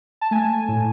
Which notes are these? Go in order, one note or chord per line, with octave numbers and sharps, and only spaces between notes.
A5
A3 G#5
A2